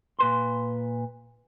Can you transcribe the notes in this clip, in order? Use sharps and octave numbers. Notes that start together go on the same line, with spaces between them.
A#2 B4 C6